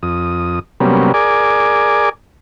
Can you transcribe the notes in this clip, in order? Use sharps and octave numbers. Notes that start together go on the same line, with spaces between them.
F2 D#6
C3 F#3 G3 A#3 B3 C#4
G#4 A#4 D5 G#5 D6